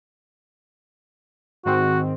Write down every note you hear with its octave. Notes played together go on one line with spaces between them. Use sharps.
G#2 D#3 C4 F#4